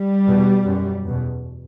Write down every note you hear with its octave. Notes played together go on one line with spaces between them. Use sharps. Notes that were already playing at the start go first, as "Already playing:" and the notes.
Already playing: G3
E2 B2
F#2
E2 B2